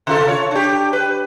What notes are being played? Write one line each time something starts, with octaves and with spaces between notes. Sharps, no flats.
C3 F4 A4
C#5
D4 G4
B4